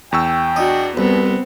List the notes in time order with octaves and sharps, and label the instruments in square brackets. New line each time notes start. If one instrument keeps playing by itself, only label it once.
[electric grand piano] E2 C#6 E6 [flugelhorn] G5
[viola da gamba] D4 F#4 [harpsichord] D#5
[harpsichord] C2 [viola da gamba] B3 C4 [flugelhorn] B4